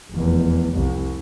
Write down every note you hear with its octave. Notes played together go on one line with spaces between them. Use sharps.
F1 E2
C2